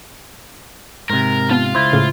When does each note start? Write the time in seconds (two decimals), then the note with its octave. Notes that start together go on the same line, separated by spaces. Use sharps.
1.10 G#2 C3 A#4
1.50 B3 F4 F5 A5
1.75 C#2 E4 C5
1.93 A2 C#3